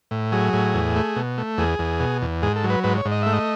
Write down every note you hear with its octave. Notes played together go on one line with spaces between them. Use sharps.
A2
F#3 G#4
A2
E2
A3
B2
A3
E2 G#4
E2
B2
E2
G#2 G#4
A4
F#3
B4
G#2 B4
C#5
G#2
D#5
A3 E5
D#5